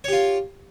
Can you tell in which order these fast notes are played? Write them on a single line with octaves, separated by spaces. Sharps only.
C#5 G4 F4